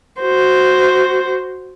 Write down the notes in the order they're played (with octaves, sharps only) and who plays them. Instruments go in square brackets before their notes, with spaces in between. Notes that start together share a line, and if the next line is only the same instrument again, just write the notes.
[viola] F#4 C5